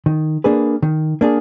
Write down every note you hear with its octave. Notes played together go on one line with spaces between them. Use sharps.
D#3
A#3 D4 G#4 B4
D#3
A#3 D4 G#4